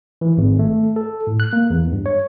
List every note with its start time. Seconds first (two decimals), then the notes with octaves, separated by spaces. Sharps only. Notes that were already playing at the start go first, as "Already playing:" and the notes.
0.21 E3
0.38 G#1
0.59 A3
0.96 A4
1.27 A2
1.40 F#6
1.53 A#3
1.70 E2
1.92 G2
2.06 C#5